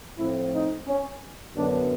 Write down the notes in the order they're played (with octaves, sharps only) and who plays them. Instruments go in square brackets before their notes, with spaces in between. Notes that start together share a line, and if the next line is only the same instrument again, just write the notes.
[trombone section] A2 F3 A3 C4 E4
D#4
C#4
F#2 D3 F#3 B3 D4